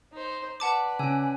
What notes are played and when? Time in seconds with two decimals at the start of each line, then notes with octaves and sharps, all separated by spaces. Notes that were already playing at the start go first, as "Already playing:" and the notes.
0.13 D#4 C5
0.60 B4 D5 F#5 A5 D6
0.99 C#3 C#4 G#5 E6